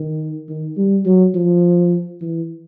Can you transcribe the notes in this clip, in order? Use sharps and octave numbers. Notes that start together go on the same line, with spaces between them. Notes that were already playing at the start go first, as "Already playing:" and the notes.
Already playing: D#3
D#3
G3
F#3
F3
E3